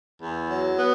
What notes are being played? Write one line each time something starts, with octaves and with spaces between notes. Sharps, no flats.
E2
F#3
B3